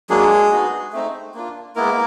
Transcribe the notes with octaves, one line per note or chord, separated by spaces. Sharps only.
F#3 G#3 A#3 D4 G#4
G#3 B3 D#4 F#4
A3 C4 D#4
A#3 D4 F4
G#3 A#3 B3 E4 A#4